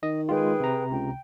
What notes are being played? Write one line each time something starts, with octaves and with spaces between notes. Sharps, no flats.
D#3 D#5
G#3 F4 G#4 B4 G5
C3 A#5
C#2 G5